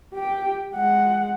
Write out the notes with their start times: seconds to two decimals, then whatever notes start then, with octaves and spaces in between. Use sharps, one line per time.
0.14 G4 G5
0.73 G#3 F#5